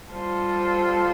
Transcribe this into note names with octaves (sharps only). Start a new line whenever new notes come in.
G3 F4 A4 C5